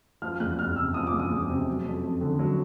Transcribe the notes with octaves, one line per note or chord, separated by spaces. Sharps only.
F3 F6
E2 F#6
E2 F6
C3 E6
F3 D#6
D6
E2
D#6
E2
C3
F#3
F2
F2
D3
F#3